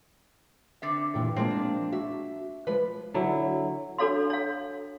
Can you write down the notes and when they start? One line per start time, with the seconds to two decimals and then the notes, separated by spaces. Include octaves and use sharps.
0.82 D3 C4 E5
1.14 G2 A#2 E3
1.36 F3 G#3 A#3 C4 D4
1.92 F#4 E5
2.67 F3 G#3 B4
3.14 D3 F#3 E4
3.98 D4 F#4 A4 C#5 F5 C6
4.30 C#5 F5